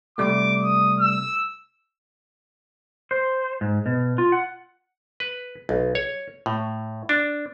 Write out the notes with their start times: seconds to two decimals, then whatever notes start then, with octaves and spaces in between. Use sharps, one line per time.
0.18 C3 G3 A3 D6
0.62 D#6
1.00 E6
3.11 C5
3.61 G#2
3.86 B2
4.18 F4
4.32 F#5
5.20 B4
5.69 B1
5.95 C#5
6.46 A2
7.09 D4